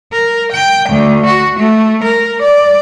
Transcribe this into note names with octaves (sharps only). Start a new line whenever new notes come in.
A#4
G5
D2
F#4
A3
A#4
D5